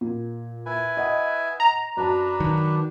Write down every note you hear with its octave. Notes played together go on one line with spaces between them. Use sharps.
A#2
E4 B4 G#5
D#5 F#5
A#5
F#2 D4 B4 A5
D#3 F#3